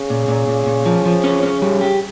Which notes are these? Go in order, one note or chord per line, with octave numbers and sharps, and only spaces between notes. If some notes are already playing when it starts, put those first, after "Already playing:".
Already playing: C#3
A#2
A#2
A#2
A#2
F3
F3
C#4
C#4
G3
G4